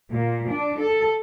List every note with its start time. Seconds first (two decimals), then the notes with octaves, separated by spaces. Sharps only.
0.10 A#2
0.48 D4
0.80 A4